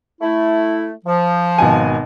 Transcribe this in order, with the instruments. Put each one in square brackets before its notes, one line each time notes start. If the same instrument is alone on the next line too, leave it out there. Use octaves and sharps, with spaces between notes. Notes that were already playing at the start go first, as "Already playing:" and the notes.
[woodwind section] A3 E4
F3
[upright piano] G#1 B2 G#5